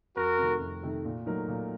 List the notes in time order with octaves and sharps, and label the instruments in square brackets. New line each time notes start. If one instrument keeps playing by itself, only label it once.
[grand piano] F2 [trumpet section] F#4 A#4
[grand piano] C3 D#3 A3
F2
C3 D#3 A3
A#2
F#3 A3 D#4 A#4
A#2